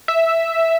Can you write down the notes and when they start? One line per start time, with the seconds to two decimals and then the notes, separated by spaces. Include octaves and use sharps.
0.08 E5